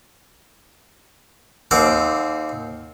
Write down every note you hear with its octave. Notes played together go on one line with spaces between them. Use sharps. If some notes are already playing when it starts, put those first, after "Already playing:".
D#2 C4 F#5 D6